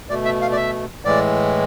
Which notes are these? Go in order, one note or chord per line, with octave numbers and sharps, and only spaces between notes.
B2 A3 D5
E5
F5
D5
E5
A2 E3 G#3 D5